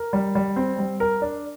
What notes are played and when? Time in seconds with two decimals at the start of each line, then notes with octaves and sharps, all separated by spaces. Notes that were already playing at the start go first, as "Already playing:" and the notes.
Already playing: A#4
0.13 G3
0.35 G3
0.56 C4
0.79 G3
1.00 A#4
1.22 D4